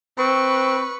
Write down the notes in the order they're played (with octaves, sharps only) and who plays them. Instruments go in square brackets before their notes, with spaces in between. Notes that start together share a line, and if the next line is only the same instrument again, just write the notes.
[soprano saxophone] C4 [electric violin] B4 C#6